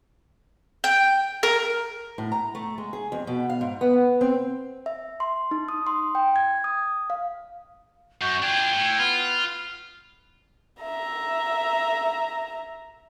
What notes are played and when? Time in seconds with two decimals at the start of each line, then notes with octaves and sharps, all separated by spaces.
0.84 G5
1.43 A#4
2.18 A2
2.32 A#5
2.55 A3
2.78 G#3
2.93 G#4
3.12 F2
3.27 B2
3.50 F5
3.61 G#2
3.81 B3
4.21 C4
4.86 E5
5.20 C6
5.51 D#4
5.69 D#6
5.87 C6
6.15 G5
6.36 G#6
6.64 D#6
7.10 F5
8.21 F#2 F#4 G6
8.43 D4 F4 G5 G#6
8.74 A2
8.99 B3 F4 F6
10.82 E5 A#5